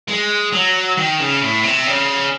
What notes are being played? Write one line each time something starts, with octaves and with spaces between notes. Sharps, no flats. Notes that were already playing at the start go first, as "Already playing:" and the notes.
G#3
F#3
D#3
C#3
A2
C3
C#3